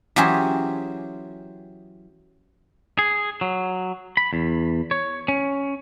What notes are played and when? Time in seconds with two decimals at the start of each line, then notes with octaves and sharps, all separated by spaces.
0.16 E3 F#3 C#4 G4 G#4 C5
2.99 G#4
3.41 F#3
4.17 B5
4.33 E2
4.91 C#5
5.28 C#4